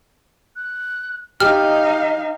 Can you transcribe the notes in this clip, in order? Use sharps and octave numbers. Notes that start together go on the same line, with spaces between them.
F#6
D#4 G4 D#5 F5 F6